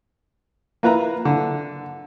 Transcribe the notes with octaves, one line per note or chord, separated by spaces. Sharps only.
A#3 F4 B4 E5 A#5
D3